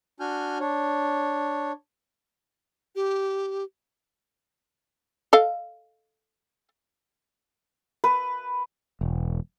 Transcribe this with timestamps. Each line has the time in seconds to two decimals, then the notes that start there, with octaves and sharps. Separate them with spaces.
0.20 D4 F#4 G#5 F6 G6
0.60 D4 C#5
2.96 G4
5.33 A4 D#5 F5
8.04 B4
9.01 E1